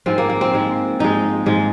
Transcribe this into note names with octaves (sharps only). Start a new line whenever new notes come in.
G#2 F3 G#3 C4
A#3
A#3
C4
G#2 F3 G#3
G#2 F3 G#3 D#4
G#2 F3 G#3